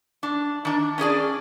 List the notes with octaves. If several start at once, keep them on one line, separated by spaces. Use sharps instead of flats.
D4
D#3 D4
C#4 D4 G#4 D5